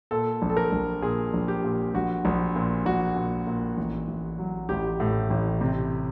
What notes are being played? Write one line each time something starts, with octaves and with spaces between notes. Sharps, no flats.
A#2 A4
A#1
A4
A#4
A#1
A#2 G#4
A#1
G4
A#2
A#1 F#4
A#1
A#2
A#1 F#4
A#2
A#2
A1
A1
F#3
A1 G4
A2
A1
C3